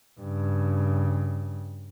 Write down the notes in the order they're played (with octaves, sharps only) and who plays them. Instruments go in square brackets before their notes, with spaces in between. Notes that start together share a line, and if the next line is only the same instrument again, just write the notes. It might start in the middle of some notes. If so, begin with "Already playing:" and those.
[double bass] G2 C#3